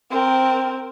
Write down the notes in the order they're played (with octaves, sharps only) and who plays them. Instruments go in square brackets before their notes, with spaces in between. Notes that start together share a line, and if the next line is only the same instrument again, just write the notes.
[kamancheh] C4 A#4